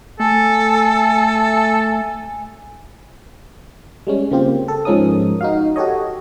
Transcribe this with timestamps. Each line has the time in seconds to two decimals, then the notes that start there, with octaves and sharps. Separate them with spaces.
0.20 A3 A4 G#5
4.07 G3 G#3 C#4
4.31 C#3 A#3 C4 F4 G4
4.68 A4
4.85 G#2 F3 G#3 C#4 A#4 D#6
5.41 D#4 F#4 F5
5.76 F#4 G4 A4 C#5 D#5